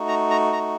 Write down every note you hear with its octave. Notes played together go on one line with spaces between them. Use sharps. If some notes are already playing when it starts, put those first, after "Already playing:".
Already playing: A3 D#4 F#4
A#5
A#5
A#5